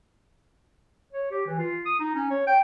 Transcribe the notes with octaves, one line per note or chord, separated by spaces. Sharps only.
C#5
G4
E3
F4
D#6
D#4
C#4
C#5
G5